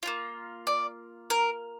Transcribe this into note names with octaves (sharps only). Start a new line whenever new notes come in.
A#3 D4 F4
D5
A#4